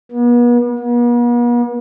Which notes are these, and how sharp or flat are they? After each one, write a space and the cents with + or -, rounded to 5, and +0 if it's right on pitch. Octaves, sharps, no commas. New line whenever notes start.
B3 -40
B3 -45